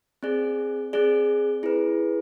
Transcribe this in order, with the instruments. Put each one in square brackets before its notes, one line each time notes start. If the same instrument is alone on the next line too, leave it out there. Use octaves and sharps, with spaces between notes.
[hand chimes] C4 G#4 D5
C4 G#4 D5
E4 G#4 B4